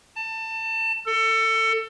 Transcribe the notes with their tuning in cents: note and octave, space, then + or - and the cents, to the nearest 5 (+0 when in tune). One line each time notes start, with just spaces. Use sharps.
A5 +25
A4 +25